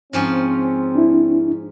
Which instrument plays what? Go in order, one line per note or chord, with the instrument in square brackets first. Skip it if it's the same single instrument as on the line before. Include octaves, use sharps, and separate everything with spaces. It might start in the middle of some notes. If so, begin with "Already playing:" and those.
[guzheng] G#2 F3 C#4 [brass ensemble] C4
[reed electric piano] D4 E4